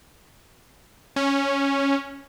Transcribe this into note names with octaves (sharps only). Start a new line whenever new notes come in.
C#4